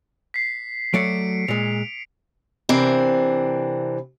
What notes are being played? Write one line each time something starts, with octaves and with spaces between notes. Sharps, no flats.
B6 C7
F#3 A3 D5 C#7 D7
A#2 G#3 F7
C3 E3 C4 D4 A#4